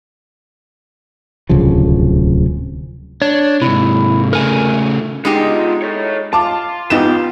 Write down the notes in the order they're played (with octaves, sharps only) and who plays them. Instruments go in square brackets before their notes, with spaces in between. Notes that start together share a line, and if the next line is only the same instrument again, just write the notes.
[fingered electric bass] D1 C2 C#3 F3
[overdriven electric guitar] D4 [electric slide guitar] C#5
[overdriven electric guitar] G#2 C3 [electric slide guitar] E4
[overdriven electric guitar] C#3 A3 [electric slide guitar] A#4 G#5
[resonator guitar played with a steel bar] G#3 D#4 G4 [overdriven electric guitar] B3 F4
[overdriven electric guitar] A4 C#5
[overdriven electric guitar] F4 [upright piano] A5 D6
[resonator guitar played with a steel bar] F2 G#2 G4 [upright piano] B3 D#4 E7